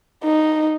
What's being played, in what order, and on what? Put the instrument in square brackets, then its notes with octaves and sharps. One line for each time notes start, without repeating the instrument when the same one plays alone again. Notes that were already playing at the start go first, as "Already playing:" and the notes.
[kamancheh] D#4